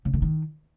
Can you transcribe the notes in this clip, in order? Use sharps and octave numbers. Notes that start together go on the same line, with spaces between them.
C#3
D3
D#3